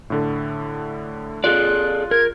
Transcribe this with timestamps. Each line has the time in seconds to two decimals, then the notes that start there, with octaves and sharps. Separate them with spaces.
0.10 A2 D3 A4
1.44 F4 G#4 A4 D5 F#6
2.11 A#4 G#6